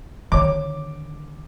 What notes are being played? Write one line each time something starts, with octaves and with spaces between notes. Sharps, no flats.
D3 D#3 C#5 D6